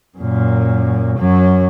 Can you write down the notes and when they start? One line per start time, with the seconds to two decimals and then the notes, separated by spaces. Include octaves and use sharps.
0.18 F#2 A#2
1.18 F#2 F#3